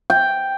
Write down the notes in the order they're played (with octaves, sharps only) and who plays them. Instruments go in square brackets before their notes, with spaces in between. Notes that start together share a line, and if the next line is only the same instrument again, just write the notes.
[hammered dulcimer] G5